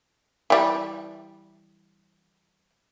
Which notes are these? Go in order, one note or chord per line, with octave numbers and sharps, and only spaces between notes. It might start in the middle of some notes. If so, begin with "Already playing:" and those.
E3 G3